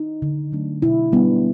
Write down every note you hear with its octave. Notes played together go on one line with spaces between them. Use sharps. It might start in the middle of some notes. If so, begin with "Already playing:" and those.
Already playing: D#4
D3
F#3 A3 D4
B2 E4
G3 B3 D4